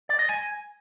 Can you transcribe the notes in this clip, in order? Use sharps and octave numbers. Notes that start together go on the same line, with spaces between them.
D5
D#5
G#5